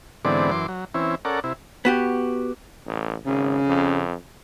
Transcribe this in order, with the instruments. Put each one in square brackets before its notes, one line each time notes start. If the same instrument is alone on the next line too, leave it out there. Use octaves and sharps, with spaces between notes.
[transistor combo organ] G#2 D3 E3 B3 C4 D5
F#2 E3 C6 D6
F#3
E3 C4 C#4 E4
C#4 A4 A#4 D5 F#5
C3 E4
[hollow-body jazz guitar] B3 F#4 G4
[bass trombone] A1
[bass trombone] G#1 [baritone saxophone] C#3
[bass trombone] F2